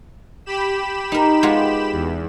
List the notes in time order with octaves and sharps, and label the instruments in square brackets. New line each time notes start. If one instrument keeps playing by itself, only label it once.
[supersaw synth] G4 B5 E7
[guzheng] D#4 A#4
G#3 B3 F4
[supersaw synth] E2